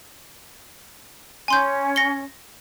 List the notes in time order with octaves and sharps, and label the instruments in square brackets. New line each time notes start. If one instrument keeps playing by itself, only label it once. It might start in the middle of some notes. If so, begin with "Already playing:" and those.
[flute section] C#4 [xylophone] G#5 C6 G6
[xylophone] A#6 C#7 G7